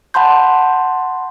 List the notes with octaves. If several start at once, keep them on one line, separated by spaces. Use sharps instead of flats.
F#5 A5 B5 C6 G6